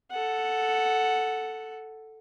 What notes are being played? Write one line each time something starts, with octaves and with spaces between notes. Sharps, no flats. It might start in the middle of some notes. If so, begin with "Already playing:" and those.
A4 F#5